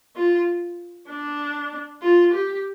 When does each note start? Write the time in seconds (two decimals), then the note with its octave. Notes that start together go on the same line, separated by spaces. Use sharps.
0.16 F4
1.09 D4
2.02 F4
2.33 G4